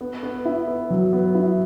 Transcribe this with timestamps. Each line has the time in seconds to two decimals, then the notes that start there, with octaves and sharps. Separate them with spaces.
0.01 B3
0.23 B3
0.45 E4
0.68 B3
0.90 F#3
1.13 B3
1.35 E4